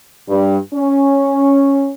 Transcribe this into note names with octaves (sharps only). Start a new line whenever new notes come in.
G2
C#4